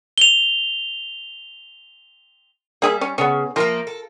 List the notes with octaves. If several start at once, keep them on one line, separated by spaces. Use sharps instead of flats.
F7 G7
G3 A#3 G#4 E5
C#4
C#3 B3 C#4
F3 A3 A#3 F4 A#4
A4